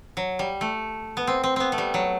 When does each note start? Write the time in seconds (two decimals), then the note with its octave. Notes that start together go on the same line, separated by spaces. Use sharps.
0.17 F#3
0.39 G3
0.61 A3
1.17 B3
1.27 C4
1.44 C4
1.56 B3 C4
1.72 A3
1.78 G3
1.94 F#3